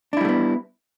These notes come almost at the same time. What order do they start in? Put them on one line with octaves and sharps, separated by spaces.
D4 E4 G3 A3 B3